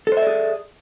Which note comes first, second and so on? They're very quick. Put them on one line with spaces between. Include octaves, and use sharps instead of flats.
A4 C5 E5 D5 G#4